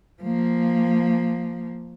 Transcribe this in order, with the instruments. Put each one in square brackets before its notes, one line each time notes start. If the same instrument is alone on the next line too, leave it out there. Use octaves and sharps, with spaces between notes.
[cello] F3 A#3